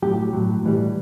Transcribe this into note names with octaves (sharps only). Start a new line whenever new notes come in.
A2 F#3 G4
A2 F#3
A2 E3 G3